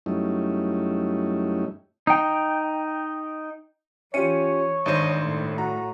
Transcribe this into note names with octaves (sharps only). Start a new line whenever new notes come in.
F#2 G3 A3 C#4 D#4 E4
D#4 G5
E3 C#4 F4 G4 C#5 C#7 D#7
G#1 G2 D#3 C5 D#5
A2
F#4 A#5